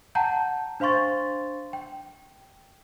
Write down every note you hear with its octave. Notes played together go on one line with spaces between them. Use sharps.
F#5 G5 A5 A#5 G6
D4 C5 F5 C6 C#6 A6
G5